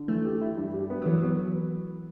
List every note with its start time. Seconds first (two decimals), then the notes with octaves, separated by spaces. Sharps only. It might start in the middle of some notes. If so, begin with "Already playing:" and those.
Already playing: D3
0.08 E3 A3
0.25 G4
0.41 E4
0.57 G2
0.73 G3
0.90 B3
1.02 F#3
1.06 E3 B3
1.19 F#3 B3